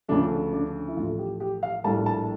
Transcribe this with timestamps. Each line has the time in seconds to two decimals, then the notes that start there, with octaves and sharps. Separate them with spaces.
0.08 D2 C#3 F3 A3 D4
0.53 D4
0.88 E4
0.96 A1 G2 F3 A3 F4
1.07 A4
1.19 G4
1.40 G4
1.63 F5
1.84 A#1 A2 G3 A#3 A5
2.06 A5